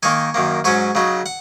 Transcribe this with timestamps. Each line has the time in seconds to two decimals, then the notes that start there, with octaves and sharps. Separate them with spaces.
0.03 D#3 A#3 D#4 G#5 C#6
0.34 F#2 D#3 A#3
0.64 G#2 F#3 C#4 G#5 C#6
0.95 C#3 F#3 D#4
1.26 F#5